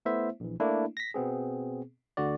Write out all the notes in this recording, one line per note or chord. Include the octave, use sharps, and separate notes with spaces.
A3 B3 E4 C5 E5
A#1 E3
A3 A#3 D4 E4
A#6 B6
B2 B3 C4 G#4
D2 D3 F#4 D5